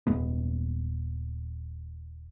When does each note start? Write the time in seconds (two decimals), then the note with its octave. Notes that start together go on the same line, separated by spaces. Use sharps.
0.07 D#1 G#3 B3